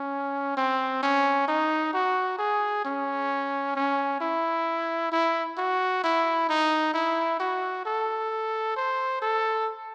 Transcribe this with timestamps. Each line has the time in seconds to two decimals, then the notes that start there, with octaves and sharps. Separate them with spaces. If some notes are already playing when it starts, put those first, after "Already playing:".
Already playing: C#4
0.57 C4
1.03 C#4
1.48 D#4
1.93 F#4
2.38 G#4
2.85 C#4
3.76 C#4
4.21 E4
5.12 E4
5.58 F#4
6.04 E4
6.49 D#4
6.94 E4
7.39 F#4
7.86 A4
8.76 C5
9.22 A4